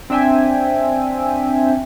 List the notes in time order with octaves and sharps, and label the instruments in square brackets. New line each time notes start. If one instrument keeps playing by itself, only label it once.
[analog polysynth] C4 D4 E5 G5 G#5